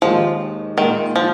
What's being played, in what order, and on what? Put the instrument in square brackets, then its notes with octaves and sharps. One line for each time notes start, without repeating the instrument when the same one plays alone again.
[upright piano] D#2 D#3 G#3 D#4 [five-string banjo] F3
[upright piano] A#2 G#3 D#4 [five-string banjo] D#3
[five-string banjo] F3